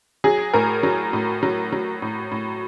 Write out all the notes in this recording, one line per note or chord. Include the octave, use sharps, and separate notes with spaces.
F#3 G#4
A2 A#4
F#3
A2
F#3
F#3
A2
A2